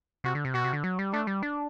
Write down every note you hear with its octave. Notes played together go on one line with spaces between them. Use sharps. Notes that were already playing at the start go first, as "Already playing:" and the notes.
C3 F#4
D3
C3
B2 F#4
C3
D3
F#3
G3
A3 D4
G3
D4